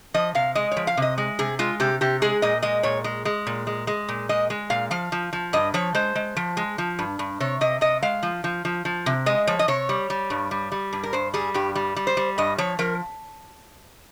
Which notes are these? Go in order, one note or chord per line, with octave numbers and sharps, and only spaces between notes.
F3 D#5
C3 F5
G#3 D#5
C#5
F3
F5
C3 D#5
G#3
C3 G#4
G#3 F4
C3 G4
C3 G4
G#3 G#4
A#2 D#5
G#3 D#5
A#2 C#5
G#3
G#3
A#2
G#3
G#3
A#2
G#3 D#5
G#3
A#2 F5
F3 F5
F3
F3
G2 D#5
F3 C#5
G#3 C5
G#3
F3
G#3
F3
G2
G2
C3 C#5
C3 D#5
C3 D#5
G#3 F5
F3
F3
F3
F3
C3
G#3 D#5
F3 C#5
D#5
C3 C#5
G3
G3
G2
G3
G3
G2
A#4
G2 C5
G3 G#4
G2 G4
G3
G3
C5
G3
G2 D#5
F3 C#5
F3 A#4